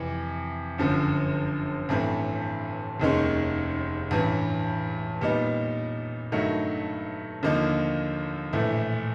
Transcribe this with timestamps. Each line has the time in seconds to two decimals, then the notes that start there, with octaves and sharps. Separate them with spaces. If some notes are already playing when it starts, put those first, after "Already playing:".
Already playing: F2 C3 E3
0.78 G1 F#2 D3 F3
1.89 A1 G2 E3 A3 C4
3.00 F1 D#2 D#3 G#3 C#4
4.11 A1 G2 E3
5.21 A#2 G3 B3 D#4
6.32 G2 D#3 F#3 A3
7.43 D#2 D3 F3 A#3 D#4
8.53 A#1 A2 E3 A3